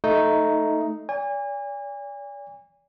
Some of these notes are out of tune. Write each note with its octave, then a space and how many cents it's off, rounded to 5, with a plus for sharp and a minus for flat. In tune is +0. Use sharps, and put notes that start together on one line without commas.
A3 +0 D#4 +0
D5 -40 G#5 -35